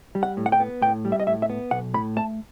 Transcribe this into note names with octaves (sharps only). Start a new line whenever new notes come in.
G3
F#5
A2
F#5
G5
B3
A2 G5
G3
E5
D#5
A2 E5
E5
B3
B1 F#5
A2 B5
A3 A5